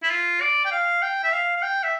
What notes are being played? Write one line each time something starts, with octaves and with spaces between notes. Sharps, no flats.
E4
F4
D5
G5
F5
G5
E5
F5
F5
G5
E5